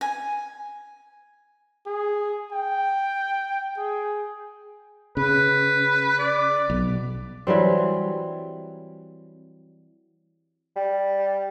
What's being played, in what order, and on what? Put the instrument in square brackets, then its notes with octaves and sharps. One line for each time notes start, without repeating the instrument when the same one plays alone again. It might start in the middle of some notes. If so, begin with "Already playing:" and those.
[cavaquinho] G#5
[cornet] G#4
G5
G#4
[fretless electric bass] C#3 [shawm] B4
[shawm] D5
[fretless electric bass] B1
[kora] E3 F#3 G3 C4
[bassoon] G3